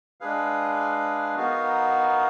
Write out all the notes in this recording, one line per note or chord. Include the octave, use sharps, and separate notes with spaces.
G#3 D4 G#4 B4 F5
B3 D#4 F#4 A#4 F5